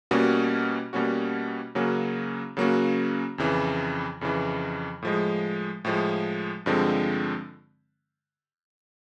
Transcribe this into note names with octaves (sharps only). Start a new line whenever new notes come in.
B2 G3 A#3 C#4 F#4
B2 G3 A#3 C#4 F#4
C#3 F#3 A#3 C#4 F#4
C#3 F#3 A#3 C#4 F#4
F2 C#3 E3
F2 C#3 E3
A2 F3 G#3
A2 F3 G#3
G2 D3 F3 G#3 C4